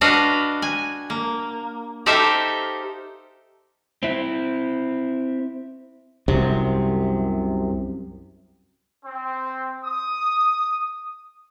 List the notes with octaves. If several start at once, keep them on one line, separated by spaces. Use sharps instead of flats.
D4 F#4 B4 D#5 F5
G#5
A#3
D#4 G4 A4 C5 E5 F5
C4 E4
C2 F#2 C3
C4
D#6